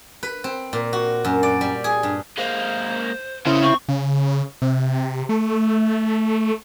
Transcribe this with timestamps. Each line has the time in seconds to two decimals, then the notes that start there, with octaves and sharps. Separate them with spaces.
0.23 B4
0.44 C4
0.73 A#2
0.93 F#4
1.25 F#2
1.43 D5
1.61 G3
1.84 G#4
2.03 G2
2.38 G#3 A#3 C5
3.47 C#3 A#3 E4 C5
3.63 C4 C#6
3.89 C#3
4.62 C3
5.29 A3